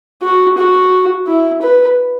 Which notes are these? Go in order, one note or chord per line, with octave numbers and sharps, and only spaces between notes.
F#4
F#4
E4
B4